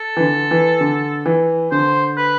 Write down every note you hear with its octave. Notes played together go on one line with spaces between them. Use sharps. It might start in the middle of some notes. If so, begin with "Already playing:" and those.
Already playing: A4
E3
D3
E3
D3
E3
D3 C5
B4